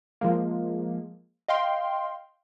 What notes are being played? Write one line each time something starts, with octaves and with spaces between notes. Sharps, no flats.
F3 G#3 A#3
D#5 F5 G5 C6